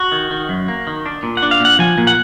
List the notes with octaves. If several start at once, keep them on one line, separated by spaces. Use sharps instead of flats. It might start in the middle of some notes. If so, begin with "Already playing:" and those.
Already playing: F#4
D#3
D#3
F#2
A#3
D#3
D4
A#2
F#5
D4
F5
A#2 F#5
F3 G#5
A#2
F#5